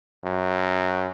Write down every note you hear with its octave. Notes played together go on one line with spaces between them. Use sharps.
F#2